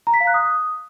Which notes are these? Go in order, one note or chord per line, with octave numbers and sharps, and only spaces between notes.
A#5
B6
F5
F#6
D#6